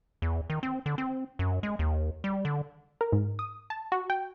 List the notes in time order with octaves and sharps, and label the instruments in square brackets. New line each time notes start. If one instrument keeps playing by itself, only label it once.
[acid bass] E2
D#3
C4
D3
C4
F#2
G#3
D#2
G3
D3
[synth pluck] A#4
G#2
D#6
A5
F#4
G5